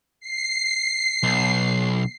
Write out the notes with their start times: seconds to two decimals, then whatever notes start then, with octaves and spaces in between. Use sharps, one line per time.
0.20 C7
1.23 B1